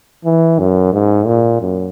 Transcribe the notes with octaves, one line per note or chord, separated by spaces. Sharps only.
E3
F#2
G#2
A#2
F#2